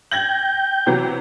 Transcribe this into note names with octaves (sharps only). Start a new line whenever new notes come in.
G5 G6 G#6 A#6 F#7
C3 E3 F#3